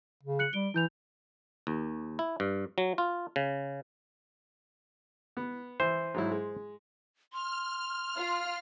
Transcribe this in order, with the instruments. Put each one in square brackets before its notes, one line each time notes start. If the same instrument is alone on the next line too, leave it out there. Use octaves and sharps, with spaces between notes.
[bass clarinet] C#3
[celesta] F#6 C#7 F#7
[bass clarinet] G3 [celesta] D7 G7
[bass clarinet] E3 [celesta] E4 G6 F7
[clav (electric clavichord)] D#2
E4
G2
F#3
F4
C#3
[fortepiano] B3
[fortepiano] E3 [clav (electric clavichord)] C5
[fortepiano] G#2 F#3 E4
G#3
[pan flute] C6 [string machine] F6
[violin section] F4